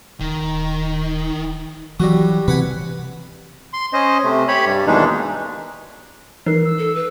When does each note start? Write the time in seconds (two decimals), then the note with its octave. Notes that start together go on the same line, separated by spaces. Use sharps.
0.20 D#1 D#3
2.00 E3 F#3 G3 F#4
2.48 C3 E3 C4 B4 F#5 G#5
3.73 C6
3.93 C#4 C5 D#5
4.24 C3 A3
4.48 G4 C#5 B5
4.66 G2 G3
4.87 D#2 B2 E3 G#3 D4 D#4
6.46 E3 D#4 A#4 C7
6.64 E6
6.79 A4
6.95 B4